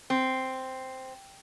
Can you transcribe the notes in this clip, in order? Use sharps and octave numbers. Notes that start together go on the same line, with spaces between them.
C4